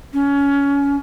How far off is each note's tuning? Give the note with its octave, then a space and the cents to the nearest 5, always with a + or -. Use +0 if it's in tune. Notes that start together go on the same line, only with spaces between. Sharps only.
C#4 +25